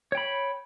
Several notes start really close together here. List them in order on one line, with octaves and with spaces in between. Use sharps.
C#5 G5 B5